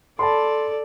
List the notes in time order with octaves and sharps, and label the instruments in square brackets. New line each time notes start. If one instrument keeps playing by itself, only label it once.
[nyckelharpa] A4 D5 [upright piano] A5 B5 C6